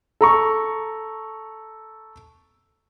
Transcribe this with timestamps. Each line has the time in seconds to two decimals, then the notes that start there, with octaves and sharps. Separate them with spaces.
0.21 A4 A#5 C#6